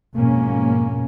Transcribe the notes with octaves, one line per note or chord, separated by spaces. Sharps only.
F2 G#2 B2 A#3 C#4